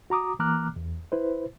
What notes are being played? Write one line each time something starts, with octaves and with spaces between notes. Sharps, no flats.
F#4 A#5 D6 D#6
E3 A#3 A#5 D6 F6 F#6
E2
E4 B4 C5